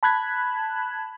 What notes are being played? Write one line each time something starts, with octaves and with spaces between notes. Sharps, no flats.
A5 B5 F#6 G#6 B6